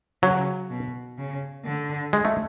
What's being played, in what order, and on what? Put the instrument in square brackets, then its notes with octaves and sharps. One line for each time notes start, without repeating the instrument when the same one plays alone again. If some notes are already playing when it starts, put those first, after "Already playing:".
[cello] C#3 [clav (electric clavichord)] F#3
[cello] B2
C#3
D3
[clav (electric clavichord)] G#3
A3